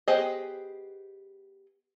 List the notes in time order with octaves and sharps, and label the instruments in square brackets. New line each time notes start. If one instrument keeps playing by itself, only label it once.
[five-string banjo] B3 G4 G#4 C5 D#5